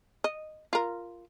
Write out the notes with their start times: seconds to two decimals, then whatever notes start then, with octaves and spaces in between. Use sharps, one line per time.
0.24 D#5
0.73 F4 A#4